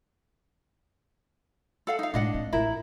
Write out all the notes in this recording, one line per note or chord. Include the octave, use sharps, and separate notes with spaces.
A4 F5 F#5
D#4 F5
A2 G#3 D4 D#5 F#5
C4
A1 E4 A#4